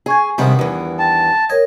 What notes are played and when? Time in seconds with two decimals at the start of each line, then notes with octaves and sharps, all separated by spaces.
0.06 G#4 G#5 C#6 G#6
0.38 G2 C3 D#3 G3 G#3 B3
0.59 E2 E3
0.99 G5 A5
1.50 A#4 C#5 D#5 G#6